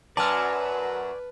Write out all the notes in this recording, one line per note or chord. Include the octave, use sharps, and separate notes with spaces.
F#2 F#3 B4 D5 G#5 A5 F6